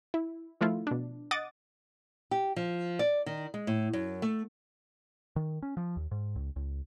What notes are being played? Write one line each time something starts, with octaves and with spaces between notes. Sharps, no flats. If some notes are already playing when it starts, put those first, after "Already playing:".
E4
D#3 F3 A3 E4 F4
B2 D4
D#5 F#5 D6 D#6 A6
G4
F3
D5
D#3
G#3
A2
F#2
A3
D#3
C#4
F3
D#2
G#2
C#2
C#2